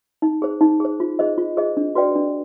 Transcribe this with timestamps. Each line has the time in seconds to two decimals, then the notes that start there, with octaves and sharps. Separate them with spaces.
0.22 D#4
0.42 G#4 C5
0.61 D#4
0.80 G#4 C5
1.00 F4
1.19 G#4 C5 D#5
1.38 F4
1.57 G#4 C5 D#5
1.77 D4
1.95 F#4 B4 D5 G5
2.15 D4